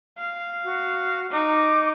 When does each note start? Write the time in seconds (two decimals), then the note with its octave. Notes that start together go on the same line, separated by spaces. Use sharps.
0.18 F5
0.64 F#4
1.31 D#4 D6